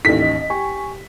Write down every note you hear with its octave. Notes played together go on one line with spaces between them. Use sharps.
A1 D#2 D#3 E4 A4 B6
D#5
G4 G#5 C#6